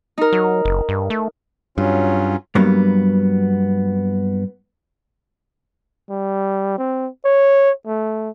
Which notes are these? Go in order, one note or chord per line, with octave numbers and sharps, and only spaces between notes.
D#4 A#4
F#3
F#1
G2
A3
G2 F#3 C#4 F4
G2 F#3 G3 A#3 B3
G3
C4
C#5
A3